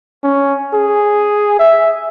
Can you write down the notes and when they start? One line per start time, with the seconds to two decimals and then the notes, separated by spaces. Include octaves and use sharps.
0.23 C#4
0.73 G#4
1.59 E5